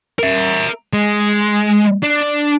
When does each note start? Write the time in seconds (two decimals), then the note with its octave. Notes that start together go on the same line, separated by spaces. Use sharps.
0.19 A#4 E5
0.93 G#3
2.03 D4